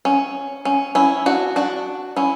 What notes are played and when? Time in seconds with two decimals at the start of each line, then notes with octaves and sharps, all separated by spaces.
0.05 C#4
0.65 C#4
0.95 C#4 E4
1.26 D4 F#4
1.56 D4 F#4
2.16 C#4 E4